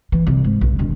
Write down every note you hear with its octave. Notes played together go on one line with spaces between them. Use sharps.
E3
C2
G#2
B1
E1 D#3